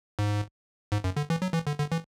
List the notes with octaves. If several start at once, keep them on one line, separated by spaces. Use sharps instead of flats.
G#2
G#2
F#2
D3
E3
F#3
E3
D3
D3
E3